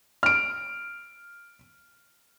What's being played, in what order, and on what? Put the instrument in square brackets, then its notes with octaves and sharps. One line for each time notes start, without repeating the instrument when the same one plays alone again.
[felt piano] F6 D7